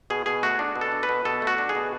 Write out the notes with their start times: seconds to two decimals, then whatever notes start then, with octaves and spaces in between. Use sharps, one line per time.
0.10 B2 G#4
0.26 B2 G#4
0.43 A3 F#4
0.59 D4
0.75 B2
0.81 A4
0.92 D4
1.03 B4
1.09 B2
1.25 B2 A4
1.42 A3
1.47 F#4
1.58 D4
1.69 G#4
1.75 B2